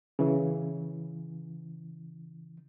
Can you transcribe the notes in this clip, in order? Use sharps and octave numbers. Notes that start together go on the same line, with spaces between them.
C#3 E3